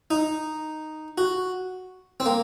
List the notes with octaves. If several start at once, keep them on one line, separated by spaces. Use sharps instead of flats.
D#4
F#4
C4
A#3